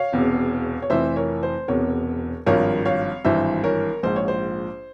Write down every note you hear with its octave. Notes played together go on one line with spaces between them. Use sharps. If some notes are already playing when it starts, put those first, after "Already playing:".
Already playing: C#5 F5
E1 E2 C3
C#5
F1 F2 E3 C5 E5
A#4 C#5
C5
E1 E2 C3 A#4 C#5
G#1 G2 F3 A#4 C#5
C#5 F5
G#1 G2 E3 C5 E5
A#4 C#5
A#1 G#2 F3 C5
C#5
C5